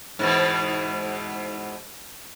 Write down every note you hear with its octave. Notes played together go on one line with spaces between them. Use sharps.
G#2 B2 E3